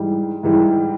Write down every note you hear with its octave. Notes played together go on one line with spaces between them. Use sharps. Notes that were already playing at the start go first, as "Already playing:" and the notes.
Already playing: G#2 E3 G3
G#2 E3 G3